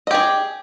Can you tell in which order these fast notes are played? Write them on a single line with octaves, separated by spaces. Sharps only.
D#5 G4 G#4